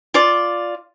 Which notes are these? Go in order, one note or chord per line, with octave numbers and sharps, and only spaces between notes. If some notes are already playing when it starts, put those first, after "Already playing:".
F4 D5